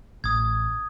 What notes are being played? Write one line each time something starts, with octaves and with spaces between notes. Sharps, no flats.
A1 D#6 G#6